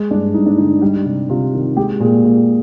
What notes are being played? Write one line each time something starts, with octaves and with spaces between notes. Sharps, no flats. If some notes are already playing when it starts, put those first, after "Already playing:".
Already playing: G#3
G2 D4
G2 D#4
D4
D3 D#4
G3
C3
C3 F4
D#3
G#3 G4
A#2 G#4
A#2